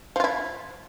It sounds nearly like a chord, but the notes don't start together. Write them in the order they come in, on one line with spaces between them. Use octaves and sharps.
F3 F4 E4